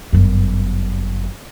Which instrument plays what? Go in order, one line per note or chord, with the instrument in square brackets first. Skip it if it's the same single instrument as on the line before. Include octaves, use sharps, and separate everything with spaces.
[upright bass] G1 F#2